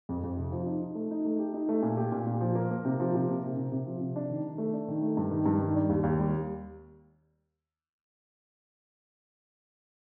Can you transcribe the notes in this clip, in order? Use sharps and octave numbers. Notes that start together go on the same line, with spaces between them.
F2
F2
C3
F3
D#4
D#4
A3
D#4
A3
G4
D#4
A3
A#2
G4
A#2
A#2
F3
A#3
A#3
C3
F3
C3
A#3
C3
C3
C3
F3
C3
D4
D#3
D#3
A3
D4
D#3
A3
G2
D#3
G2
D#3
D4
D#2
D#2
G3